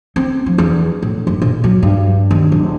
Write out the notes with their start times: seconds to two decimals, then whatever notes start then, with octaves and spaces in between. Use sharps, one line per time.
0.16 C4
0.46 F3
0.58 E2
1.02 A2
1.27 F#1
1.42 A#2
1.64 F#3
1.83 G2
2.31 D#2
2.52 D1